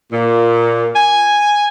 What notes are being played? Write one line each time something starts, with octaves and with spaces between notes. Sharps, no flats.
A#2
G#5